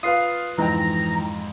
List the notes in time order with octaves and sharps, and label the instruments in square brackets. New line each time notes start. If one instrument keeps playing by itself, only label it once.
[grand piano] F4 B4 F5 [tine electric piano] D#6 C7
[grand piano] F2 G#2 [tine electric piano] E3 G5 [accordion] A#5